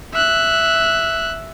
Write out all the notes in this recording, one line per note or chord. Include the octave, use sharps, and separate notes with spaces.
E5 F#6